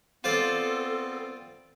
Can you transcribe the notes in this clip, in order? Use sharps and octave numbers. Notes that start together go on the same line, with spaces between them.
B3 C4 F4 A4 C5 D5